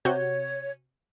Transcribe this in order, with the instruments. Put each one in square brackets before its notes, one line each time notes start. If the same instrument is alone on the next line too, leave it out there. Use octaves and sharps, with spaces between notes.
[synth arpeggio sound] C3 F#4 G6 [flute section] C#5